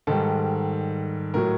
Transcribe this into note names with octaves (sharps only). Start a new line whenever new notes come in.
G#2 D#3 G3 A4
A2 F#3 A#4